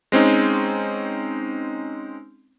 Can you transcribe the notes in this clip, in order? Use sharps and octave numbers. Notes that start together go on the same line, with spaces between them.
G#3 C4 C#4 D#4